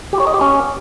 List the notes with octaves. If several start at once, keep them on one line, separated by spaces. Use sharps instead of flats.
G4
C#5
D#5
G4
C#4